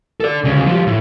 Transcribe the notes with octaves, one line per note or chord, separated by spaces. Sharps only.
A4 D5
D2 C#3
F3 G3
A2